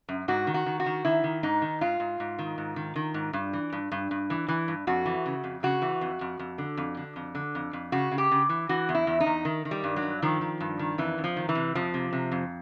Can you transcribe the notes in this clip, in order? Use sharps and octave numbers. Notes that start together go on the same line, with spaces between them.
F#2
G#2 F#4
D#3
F#4
D#3
F#4
D#3
D#3 E4
D#3
G#2 D#4
D#3
G#2 F4
G#2
G#2
D#3
G#2
D#3
D#3
G#2
G2
E3
G2
G2
G2
E3
E3
G2
F2 F#4
E3
C#3
F2
C#3 F#4
E3
F2
F2
F2
D3
F2
D3
F2
D3
F2
F2
C#3 F#4
C#3
G4
C#3
E3
E3 F#4
E2
E4
E2
D#4
E2
D#3
D#3
G3
G2
F#3
G2
D#3 F3
D#3
G2
D#3
F2 E3
F2
F3
D#3
E3
C3
F2 F3
C3
C3
F2